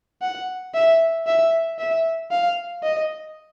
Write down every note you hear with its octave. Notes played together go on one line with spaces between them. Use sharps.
F#5
E5
E5
E5
F5
D#5